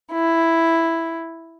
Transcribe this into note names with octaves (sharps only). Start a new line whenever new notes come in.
E4